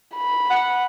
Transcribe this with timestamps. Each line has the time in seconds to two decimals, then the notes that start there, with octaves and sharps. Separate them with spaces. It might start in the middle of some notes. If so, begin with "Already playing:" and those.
0.16 B5
0.50 F#5